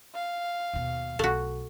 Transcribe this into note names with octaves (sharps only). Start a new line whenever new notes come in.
F5
D#2 B2
B1 A3 F#4